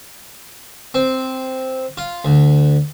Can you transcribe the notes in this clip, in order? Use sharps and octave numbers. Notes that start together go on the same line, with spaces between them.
C4
F4
D2